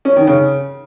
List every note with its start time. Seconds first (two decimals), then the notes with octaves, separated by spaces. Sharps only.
0.05 C#4
0.16 D#3
0.27 C#3